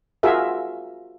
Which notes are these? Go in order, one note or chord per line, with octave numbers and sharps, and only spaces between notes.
F4 F#4 G#4 A#4 E5